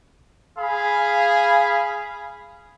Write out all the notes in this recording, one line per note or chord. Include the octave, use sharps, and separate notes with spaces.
G#4 F5 B5